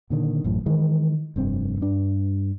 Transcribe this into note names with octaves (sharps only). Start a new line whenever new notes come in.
A#2 D3 D#3
A1 F#2 A2
D#3 E3 G#3
F1 G2 C4
G2 D4